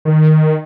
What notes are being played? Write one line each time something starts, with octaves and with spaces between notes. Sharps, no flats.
D#3